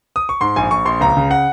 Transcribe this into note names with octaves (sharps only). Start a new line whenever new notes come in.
D#6
C#6
G#2 C6
A#1 G#5
A#1 C#6
A#1 C6
C#2 A#5
C#3
F#5